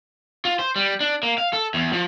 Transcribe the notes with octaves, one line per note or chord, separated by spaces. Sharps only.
F4
C5
G3
D4
A#3
F5
A4
E2
F3